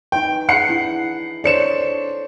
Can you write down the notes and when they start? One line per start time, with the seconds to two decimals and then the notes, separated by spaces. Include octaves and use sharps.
0.12 D#4 B4 G5
0.49 C#4 G#4 F#5 C7 C#7
0.69 D4 E4
1.44 D4 A4 C5 C#5 C#7 E7